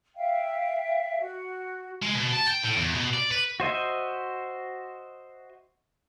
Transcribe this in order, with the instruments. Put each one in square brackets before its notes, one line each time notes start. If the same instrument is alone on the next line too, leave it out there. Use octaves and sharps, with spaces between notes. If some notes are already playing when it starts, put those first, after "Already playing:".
[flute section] E5 F5 G5
F#4
[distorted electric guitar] G#3
B2
A5
G5
A2
E2
B2
D5
B4
[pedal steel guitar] F#4 C5 D#5 E5